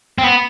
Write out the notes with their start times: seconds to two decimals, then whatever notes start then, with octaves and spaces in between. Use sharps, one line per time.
0.18 C4
0.24 B3